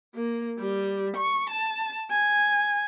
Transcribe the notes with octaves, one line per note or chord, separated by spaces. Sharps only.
A#3
G3
C#6
A5
G#5